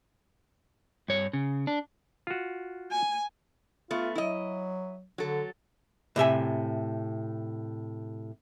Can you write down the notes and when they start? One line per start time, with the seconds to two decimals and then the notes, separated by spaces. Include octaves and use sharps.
1.08 G2 C#5
1.33 C#3
1.67 D4
2.27 F4 F#4
2.92 G#5
3.91 A3 B3 F4
4.16 F#3 E4 D#5
5.18 D3 F#3 A4
6.16 A2 C3 E5 G#5